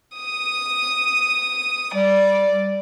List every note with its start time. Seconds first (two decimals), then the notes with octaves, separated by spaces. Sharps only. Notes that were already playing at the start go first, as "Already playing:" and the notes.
0.19 D#6
1.95 G3 D5